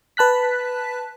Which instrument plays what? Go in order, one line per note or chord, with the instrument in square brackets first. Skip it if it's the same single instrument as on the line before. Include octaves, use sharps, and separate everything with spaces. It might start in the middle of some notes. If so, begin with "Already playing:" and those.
[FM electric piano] B4 A5 F#6 B6